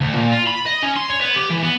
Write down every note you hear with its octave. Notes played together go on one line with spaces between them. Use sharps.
D2
A#2
F4
B5
D#5
C#4
C6
C#5
B3
G4
E3
B3